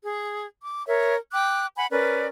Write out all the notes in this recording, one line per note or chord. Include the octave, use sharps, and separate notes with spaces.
G#4
D6
A#4 C#5 E5
G5 D6 F#6
F#5 G#5 B5
C#4 A#4 B4 D5